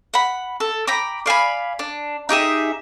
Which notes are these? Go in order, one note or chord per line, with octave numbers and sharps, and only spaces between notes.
F#5 B5
A4
G5 A#5 B5 D6
D5 F5 G#5 B5
D4
D#4 G4 G#4 E5